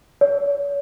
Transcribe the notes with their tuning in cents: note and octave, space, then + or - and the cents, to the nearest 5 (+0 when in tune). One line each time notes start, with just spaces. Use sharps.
C#5 +40